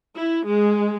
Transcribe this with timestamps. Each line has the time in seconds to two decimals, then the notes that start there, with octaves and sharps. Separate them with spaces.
0.16 E4
0.46 G#3